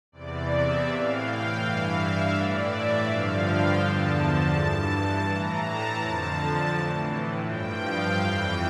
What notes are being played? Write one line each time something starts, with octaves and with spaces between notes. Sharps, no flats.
E2 C3 E3 D5
E5
A2 E3 F5
G5
G2 E3 F5
E5
A2 E3 D5
E5
G2 D3 F3 F5
G5
E2 D3 F3 A5
A5
G2 E3
A2 E3 A#5
A5
F2 D3 F3 A5
A2 E3
G2 F3 G5
F5
F2 E3 G5